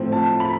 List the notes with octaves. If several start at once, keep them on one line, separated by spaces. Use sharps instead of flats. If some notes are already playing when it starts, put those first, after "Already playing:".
Already playing: A2 F3 A3 C4
A5
B5